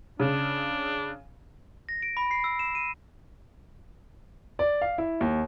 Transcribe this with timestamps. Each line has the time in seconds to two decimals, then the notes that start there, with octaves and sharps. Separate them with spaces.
0.20 C#3 D4
1.89 A#6
2.03 D7
2.17 B5
2.31 C7
2.44 E6
2.59 E7
2.75 D#7
4.59 D5
4.81 F5
4.98 E4
5.21 D#2